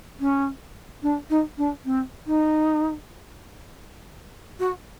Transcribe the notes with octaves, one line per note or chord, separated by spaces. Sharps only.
C#4
D4
D#4
D4
C4
D#4
F#4